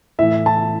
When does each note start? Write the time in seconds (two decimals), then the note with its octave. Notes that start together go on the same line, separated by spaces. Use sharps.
0.19 A2 E3 E5
0.46 A5